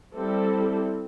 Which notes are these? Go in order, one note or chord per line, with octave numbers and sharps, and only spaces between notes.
G3 C4 E4 A4